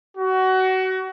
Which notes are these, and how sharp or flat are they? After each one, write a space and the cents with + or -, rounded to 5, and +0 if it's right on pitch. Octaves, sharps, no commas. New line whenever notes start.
F#4 +25